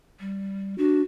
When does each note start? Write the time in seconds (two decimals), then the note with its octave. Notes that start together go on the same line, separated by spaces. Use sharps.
0.20 G3
0.78 D4 F#4